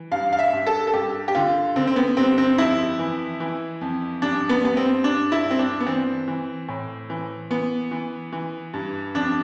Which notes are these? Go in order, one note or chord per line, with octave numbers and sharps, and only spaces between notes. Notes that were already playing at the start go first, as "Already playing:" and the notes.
Already playing: E3
G2 F5
F5
E5
G2
A4
A4
G2 G4
G4
D3 F4
D3 C4
C4
B3
G2 C4
C4
F2 E4
E3
E3
F2
G2 D4
B3
G2 B3
C4
G2 D4
E4
G2
C4
D4
B3
E3 C4
E3
A2
E3
E3 B3
E3
E3
G2
F2 D4